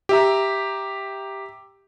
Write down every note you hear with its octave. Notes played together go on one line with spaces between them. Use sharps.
G4 E5 A#5